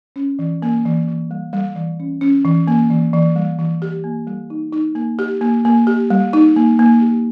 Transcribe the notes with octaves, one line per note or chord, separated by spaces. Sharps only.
C#4
E3
A#3
E3
E3
G3
G3
E3
C#4
C#4
E3
A#3
E3
E3
G3
E3
G4
A#3
G3
D#4
D#4
A#3
G4
A#3
A#3
G4
G3
D#4
A#3
A#3
G4